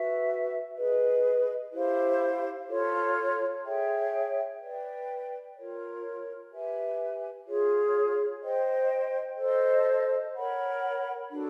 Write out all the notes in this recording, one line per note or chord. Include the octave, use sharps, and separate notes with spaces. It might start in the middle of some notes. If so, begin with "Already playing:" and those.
Already playing: F#4 B4 E5
G#4 B4 D#5
E4 G4 C5 F5
F4 A4 C#5
G#4 C#5 E5 G5
B4 D5 G5
F4 A#4 C#5
G4 B4 E5 G#5
F4 G#4 C#5
C5 D#5 G5
A4 C5 D#5
A#4 C#5 F#5 B5
D4 F#4 A4